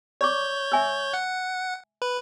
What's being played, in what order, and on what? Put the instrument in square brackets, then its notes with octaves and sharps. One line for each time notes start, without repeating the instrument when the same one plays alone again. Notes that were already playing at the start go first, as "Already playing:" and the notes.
[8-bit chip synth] C#5 G6 [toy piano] D5 C#6 D6
[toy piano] E5 G#5 E6
[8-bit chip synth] F#5
B4